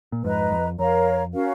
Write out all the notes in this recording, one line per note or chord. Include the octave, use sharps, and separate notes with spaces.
A#2
F2 G#2 B4 D#5 A#5
F2
F2 A#4 C#5 F5 A#5
C#4 F#4 A#4 F5